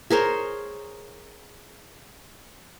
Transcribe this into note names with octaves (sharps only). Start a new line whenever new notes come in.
G#4 A#4 C5 C#5